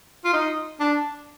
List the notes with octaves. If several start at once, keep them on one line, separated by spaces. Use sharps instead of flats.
F4
D#4
D4